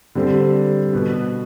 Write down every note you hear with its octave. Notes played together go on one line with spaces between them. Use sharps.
D3 G3 C4
B2 B3